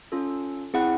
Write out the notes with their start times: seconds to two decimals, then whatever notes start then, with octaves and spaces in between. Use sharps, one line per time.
0.12 C#4 F4 A4
0.74 C4 E4 G#4 F#5